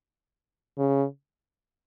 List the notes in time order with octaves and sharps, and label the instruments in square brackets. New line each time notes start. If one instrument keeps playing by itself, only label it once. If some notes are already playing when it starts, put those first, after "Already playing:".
[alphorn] C#3